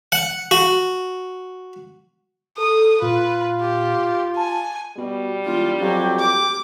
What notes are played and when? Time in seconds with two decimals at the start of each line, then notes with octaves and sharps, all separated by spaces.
0.12 F#5
0.51 F#4
2.58 A4 D#6
3.02 A#2 F4 B4
3.61 G4
4.37 G#5 A5
4.97 B2 G3
5.45 E1 F4
5.81 F2 F#3 G4
6.19 D6